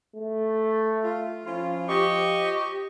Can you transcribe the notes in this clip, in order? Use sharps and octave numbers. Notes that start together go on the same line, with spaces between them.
A3
F4
F3 C#4 E4 F4
G4 D#5 C#6